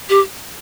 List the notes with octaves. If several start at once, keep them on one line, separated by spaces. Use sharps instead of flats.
G4